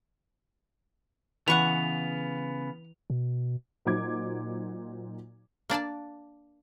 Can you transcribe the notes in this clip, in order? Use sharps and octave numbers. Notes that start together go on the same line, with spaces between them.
C#3 E3 B3 B4 F#5 C#6 F7
B2
A#2 F#3 D#4 C5 D6 G#6
A#3 D4 D5 A5